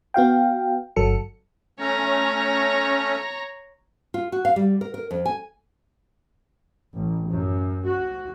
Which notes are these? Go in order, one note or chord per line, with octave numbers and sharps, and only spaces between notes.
B3 F#4 F5 G5
G1 F#3 A4 C#7
A3 C#4 C#5 A#5
F4
F#4
F5
G3
A#4
A#4
F2
G#5
A1
F#2
F#4